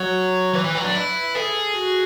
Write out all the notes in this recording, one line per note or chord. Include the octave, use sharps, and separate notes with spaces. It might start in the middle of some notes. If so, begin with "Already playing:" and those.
Already playing: F#3 C#5
E3 B4
E3
F#3
D4
E4
G#4 A4
F#4